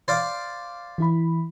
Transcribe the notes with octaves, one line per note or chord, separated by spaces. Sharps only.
C5 D5 F5
E3 E4 B5